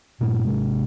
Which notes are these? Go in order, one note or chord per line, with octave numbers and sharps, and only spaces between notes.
G2 A#2 D4
G#1 C3 G#3